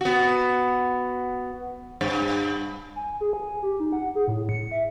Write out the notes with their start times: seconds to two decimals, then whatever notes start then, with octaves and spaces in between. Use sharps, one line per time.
0.01 B3 F#4
2.01 G2
2.96 G#5
3.21 G#4
3.33 G#5
3.62 G4
3.80 D#4
3.92 F#5
4.15 G#4
4.27 A2
4.49 C#7
4.72 E5